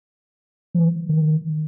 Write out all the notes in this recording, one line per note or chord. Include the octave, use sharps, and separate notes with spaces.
F3
E3
D#3